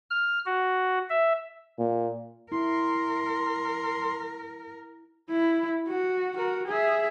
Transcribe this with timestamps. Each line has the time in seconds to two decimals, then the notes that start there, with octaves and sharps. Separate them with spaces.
0.10 F6
0.46 F#4
1.10 E5
1.79 A#2
2.52 E4 A#4 C6
5.30 E4
5.89 F#4
6.36 F#4 A#4
6.68 G#4 E5